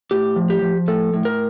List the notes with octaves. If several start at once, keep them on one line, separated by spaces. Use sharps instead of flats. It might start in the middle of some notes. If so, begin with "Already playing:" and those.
A2 G4
F3
G4
F3
A2 A4
A2
A#4